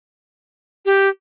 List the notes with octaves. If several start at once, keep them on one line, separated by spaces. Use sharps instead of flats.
G4